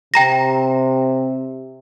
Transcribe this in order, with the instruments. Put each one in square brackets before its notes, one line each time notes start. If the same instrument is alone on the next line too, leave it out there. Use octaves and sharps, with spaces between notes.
[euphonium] C3 [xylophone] G5 A#5 A#6